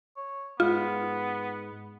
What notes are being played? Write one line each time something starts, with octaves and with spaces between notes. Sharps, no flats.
C#5
G#2 G#3 B3 F4